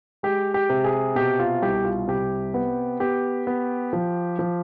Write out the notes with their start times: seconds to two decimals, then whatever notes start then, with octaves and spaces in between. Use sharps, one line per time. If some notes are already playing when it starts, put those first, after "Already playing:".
0.23 G#3 G4
0.54 G4
0.70 C3
0.84 G#4
1.15 B2 G4
1.39 F4
1.62 C2 G4
1.85 F4
2.08 C3 G4
2.54 B3
3.00 B3 G4
3.47 B3
3.93 F3
4.39 F3